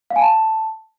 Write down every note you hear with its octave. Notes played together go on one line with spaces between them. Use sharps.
F5
G#5
A5